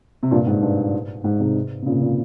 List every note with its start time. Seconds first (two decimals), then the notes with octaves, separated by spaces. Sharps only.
0.23 C3
0.31 G2 A#2
0.47 G#2
0.62 G2
1.24 G#2
1.40 G#2 C3
1.82 C3
1.86 A#2 C#3
2.01 A#2 C#3